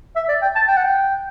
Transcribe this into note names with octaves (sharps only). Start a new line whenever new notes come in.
E5
D5
G5
A5
G5
F#5
G5